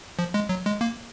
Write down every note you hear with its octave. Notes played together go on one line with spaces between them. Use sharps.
F3
G#3
F#3
G#3
A#3